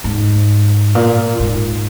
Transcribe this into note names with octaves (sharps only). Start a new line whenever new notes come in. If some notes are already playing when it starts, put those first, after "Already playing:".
G#2
A#2
G#2